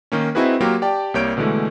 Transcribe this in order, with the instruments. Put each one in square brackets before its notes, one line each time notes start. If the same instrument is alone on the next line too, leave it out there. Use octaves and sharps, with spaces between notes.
[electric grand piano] D#3 A#3 C#4
C4 D#4 E4 F#4 G#4 B4
F#3 A#3 F4 G4 A#4
G4 D5 G5 A5
C2 G3 A#3 C#5 G6 D7
B2 D3 E3 G#3 A3